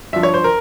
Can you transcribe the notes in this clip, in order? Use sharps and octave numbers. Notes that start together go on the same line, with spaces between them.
G2 F3 E5
C#5
C5
A#4